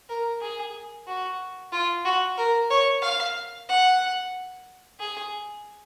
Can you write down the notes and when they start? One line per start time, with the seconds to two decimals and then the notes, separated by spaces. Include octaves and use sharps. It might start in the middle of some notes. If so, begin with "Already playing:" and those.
0.09 A#4
0.41 G#4
1.07 F#4
1.72 F4
2.05 F#4
2.38 A#4
2.70 C#5
3.02 F5
3.69 F#5
4.99 G#4